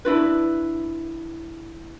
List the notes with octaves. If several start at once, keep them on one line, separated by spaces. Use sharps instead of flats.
D4 E4 F4 B4